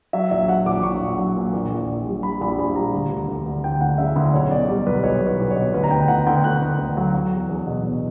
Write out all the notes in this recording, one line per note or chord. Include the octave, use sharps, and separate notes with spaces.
F#3 E5
A#1 E5
F#3 F#5
A#1 D6
A#1 C#6
A#1
F#3
A#2
A#1
A#1
A#1
G3
G3 B5
A#1 B5
A#1 B5
G3 A#5
D2
D2
D2
D2
D2 G5
D2 F#5
C#3 E5
D2
B1 C#5
B2 D5
G3
B1 B4
B1 C#5
B1
B4
B1
C#5
B2
D2 B4
A#5
D2 G5
D2 F#5
D2 G5
D2 F#6
D2
D2
F#3
F#3
E2
E2
B2
B2